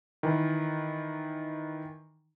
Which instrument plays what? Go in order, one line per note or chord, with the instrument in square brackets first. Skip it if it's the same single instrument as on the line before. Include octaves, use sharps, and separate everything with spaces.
[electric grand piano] D#3 E3